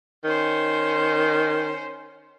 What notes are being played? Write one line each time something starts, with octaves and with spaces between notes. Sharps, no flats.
D#3 C#4 C5